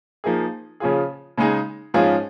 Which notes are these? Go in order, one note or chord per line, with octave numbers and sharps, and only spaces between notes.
F3 A#3 D#4 G#4
C#3 F3 C#4 F4 G#4
C#3 G#3 D#4 G#4
G#2 F3 C#4 F4 G#4